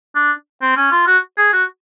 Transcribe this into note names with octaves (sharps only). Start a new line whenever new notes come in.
D4
C4
C#4
F4
F#4
G#4
F#4